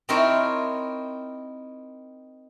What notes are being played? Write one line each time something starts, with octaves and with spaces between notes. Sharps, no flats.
C4 D#4 E4 A#4 C5 C#5